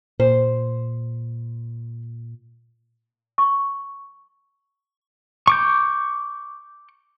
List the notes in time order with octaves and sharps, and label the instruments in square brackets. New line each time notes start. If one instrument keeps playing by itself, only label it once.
[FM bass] A#2 [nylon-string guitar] C5
[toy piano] C#6
[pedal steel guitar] C#6 D6 G6